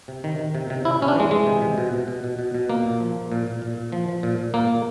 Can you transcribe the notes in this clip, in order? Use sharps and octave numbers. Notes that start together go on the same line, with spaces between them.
C3
D#3
D#3
C3
C3
C3 E4
C3 C#4
D4
E3 G#3
E3 G#3
C3
C3
B2
B2
B2
B2
B2
B2
A#2 A#3
A#2
F3
F3
A#2
A#2
A#2
A#2
F3
F3
A#2
A#2
A#2 A#3
A#2